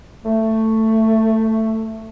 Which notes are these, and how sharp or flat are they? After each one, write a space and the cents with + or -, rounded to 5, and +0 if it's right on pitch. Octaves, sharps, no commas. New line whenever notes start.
A3 +10